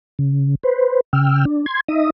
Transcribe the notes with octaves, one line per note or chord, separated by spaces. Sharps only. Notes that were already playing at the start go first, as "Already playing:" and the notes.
C#3
B4 C5
C#3 G5 E6 F6
D4
C6 G#6
D#4 D#5 E5 D#6